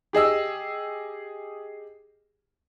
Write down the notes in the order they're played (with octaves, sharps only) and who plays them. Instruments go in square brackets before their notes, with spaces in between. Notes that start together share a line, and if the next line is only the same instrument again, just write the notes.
[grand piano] G4 G#4 D#5 E6